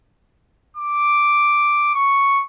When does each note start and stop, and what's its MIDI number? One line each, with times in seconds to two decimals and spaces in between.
0.77 1.90 86
1.94 2.42 85